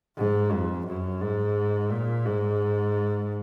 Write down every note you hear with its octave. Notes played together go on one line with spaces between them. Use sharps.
G#2
F2
F#2
G#2
A#2
G#2